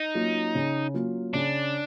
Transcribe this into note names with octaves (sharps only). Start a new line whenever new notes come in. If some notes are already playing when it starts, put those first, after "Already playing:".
Already playing: D#4
F#3 A#3 C#4 F4
C#3
F#3 A#3 C#4 F4
C#3 D4